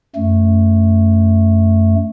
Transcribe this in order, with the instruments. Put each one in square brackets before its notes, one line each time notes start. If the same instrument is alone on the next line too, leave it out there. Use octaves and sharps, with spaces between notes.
[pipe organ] F#2 A3